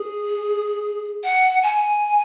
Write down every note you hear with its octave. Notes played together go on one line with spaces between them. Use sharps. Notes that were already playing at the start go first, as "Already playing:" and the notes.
Already playing: G#4
F#5
G#5